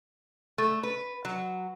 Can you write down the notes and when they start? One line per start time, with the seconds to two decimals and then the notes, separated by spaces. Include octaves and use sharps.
0.58 A3
0.83 B4
1.25 F#3